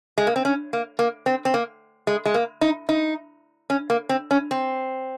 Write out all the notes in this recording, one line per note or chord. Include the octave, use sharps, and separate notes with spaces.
G#3
A#3
C4
C#4
A#3
A#3
C4
C4
A#3
G#3
G#3
A#3
D#4
D#4
C#4
A#3
C4
C#4
C4